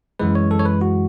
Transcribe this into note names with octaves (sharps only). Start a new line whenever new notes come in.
F#2 E3 G#3 B4
C#5
A4
C#5
B4
F#4